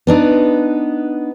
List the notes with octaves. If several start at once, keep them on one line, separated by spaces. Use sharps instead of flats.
B3 D4 D#4